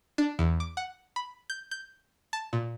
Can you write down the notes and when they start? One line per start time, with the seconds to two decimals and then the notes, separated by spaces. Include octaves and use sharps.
0.18 D4
0.39 E2
0.60 D6
0.77 F#5
1.16 B5
1.50 G6
1.71 G6
2.33 A5
2.53 A#2